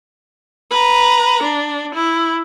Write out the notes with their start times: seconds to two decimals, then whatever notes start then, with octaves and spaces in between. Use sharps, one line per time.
0.71 B4 A#5
1.43 D4
1.94 E4